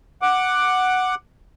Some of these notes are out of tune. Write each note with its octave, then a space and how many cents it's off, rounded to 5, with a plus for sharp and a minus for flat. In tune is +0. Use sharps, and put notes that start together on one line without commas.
F#5 +0 D6 +10